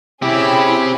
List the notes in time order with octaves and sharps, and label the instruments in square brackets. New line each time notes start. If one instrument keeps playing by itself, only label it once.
[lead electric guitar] C4 G4 [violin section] C#4 G#4 B5 [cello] E4